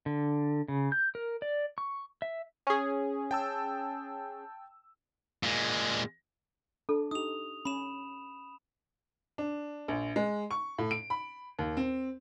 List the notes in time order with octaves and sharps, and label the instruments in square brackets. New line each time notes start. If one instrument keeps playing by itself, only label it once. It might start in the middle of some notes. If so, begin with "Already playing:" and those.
[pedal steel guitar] D3
C#3
G6
A#4
D5
C#6
E5
[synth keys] C#4 G#4
[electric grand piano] G5 A5 E6
[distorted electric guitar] A#2 G#3
[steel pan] D4 [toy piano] A4
[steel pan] D#4 G4 [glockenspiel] D#6 F7
[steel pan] C#4 [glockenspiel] B5 E7
[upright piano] D4
A#1
G#3
C#6
A2
D7
B5
D#2
C4